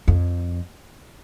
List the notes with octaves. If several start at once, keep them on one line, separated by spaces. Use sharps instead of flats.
F2